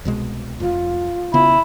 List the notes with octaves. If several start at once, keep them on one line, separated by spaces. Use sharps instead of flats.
C2 B2 G#3
F1 F4
C#3 B3 E4